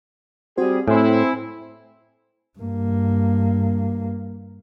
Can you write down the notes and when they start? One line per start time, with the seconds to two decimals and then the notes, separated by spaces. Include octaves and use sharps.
0.58 G3 C4 F#4 G#4 C5
0.88 A2 C4 E4 G#5 C6
2.59 G2 A#3